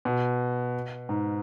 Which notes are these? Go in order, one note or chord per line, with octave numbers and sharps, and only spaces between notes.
B2
G#2